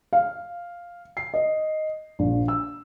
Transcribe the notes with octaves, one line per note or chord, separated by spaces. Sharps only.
F5
C7
D#5
A#1
E6